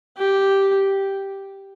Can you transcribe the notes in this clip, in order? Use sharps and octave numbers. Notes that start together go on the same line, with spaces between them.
G4